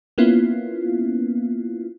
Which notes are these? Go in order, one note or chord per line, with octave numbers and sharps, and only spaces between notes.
A#3 B3 C#4 E4 F4